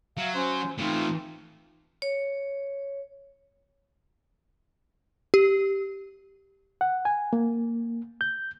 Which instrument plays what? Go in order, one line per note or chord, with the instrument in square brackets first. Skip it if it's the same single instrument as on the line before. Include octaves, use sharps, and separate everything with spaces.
[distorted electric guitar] F#3 [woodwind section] F#4 E5 F5
[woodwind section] C#4 C5
[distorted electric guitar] A2 E3 [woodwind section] C4 D#4 F4
[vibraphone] C#5
[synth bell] G4
[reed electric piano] F#5
G#5
A#3
G6